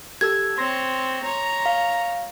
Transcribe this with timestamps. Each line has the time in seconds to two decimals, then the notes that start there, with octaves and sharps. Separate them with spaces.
0.21 G4 A4 E6 G#6
0.58 C4 C#5 C6 A#6
1.23 C#5 A#5
1.66 F5